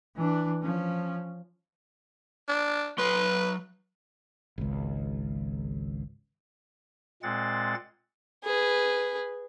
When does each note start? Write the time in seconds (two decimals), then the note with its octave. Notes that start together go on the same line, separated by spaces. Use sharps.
0.16 E3 D4
0.62 F3 C#4
2.48 D4
2.99 F#3 B4 C6
4.58 G#1 C#2
7.23 A#2 G#3 C4 F#5 A6
8.44 G#4 B4